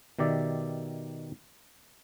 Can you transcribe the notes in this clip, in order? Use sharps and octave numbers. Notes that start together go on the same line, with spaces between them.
B2 D#3 G4 D5 E5